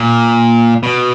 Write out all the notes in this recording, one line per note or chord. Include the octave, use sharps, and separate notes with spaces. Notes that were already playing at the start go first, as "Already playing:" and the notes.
Already playing: A#2
B2